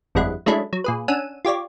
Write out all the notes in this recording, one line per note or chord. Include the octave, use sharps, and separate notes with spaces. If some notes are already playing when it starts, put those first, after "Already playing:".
G1 F2 G3 G#3 E4 F#5
F#3 G#3 A3 C#4 D4 E4
F#3
A#2 G#4 B4
C#4 D4 F#5 E6 D#7
F4 G4 C#5 D5